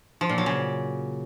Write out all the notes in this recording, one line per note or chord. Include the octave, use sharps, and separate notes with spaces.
F3
A#2
F#3
C#3